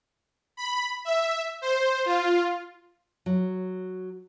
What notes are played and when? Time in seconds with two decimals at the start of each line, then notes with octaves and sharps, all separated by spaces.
0.57 B5
1.05 E5
1.62 C5
2.06 F4
3.26 F#3